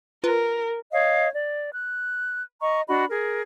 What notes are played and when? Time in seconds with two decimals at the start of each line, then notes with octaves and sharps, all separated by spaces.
0.24 F4 A#4 B4
0.92 C#5 D#5 F5
1.34 D5
1.73 F#6
2.61 D#5 A#5 C#6
2.88 D4 F#4 D#5 B5
3.09 G#4 A#4